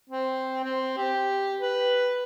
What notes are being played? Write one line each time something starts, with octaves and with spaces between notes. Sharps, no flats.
C4
C4
G4
B4